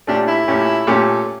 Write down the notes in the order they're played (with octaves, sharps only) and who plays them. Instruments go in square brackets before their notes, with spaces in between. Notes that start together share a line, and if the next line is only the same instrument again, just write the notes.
[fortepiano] A#2 A3 C#4 G4 [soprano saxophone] D4
[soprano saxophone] E4
[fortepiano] A#2 A3 C#4 G4
A#2 A3 C#4 G4